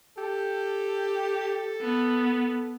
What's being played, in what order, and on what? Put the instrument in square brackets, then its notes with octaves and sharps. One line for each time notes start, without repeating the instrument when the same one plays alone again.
[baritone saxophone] G4 [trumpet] A4
[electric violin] B3